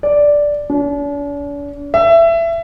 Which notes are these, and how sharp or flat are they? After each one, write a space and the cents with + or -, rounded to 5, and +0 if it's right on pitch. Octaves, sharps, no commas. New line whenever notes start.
D5 -5
D4 -45
E5 +20